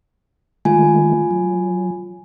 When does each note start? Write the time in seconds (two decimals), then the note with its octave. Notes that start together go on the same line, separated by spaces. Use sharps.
0.65 D#3 G#3 A3 F4 G#5
1.31 F#3